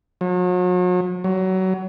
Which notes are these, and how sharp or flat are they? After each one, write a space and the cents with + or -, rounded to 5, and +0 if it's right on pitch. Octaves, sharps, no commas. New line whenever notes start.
F#3 -40
F#3 +25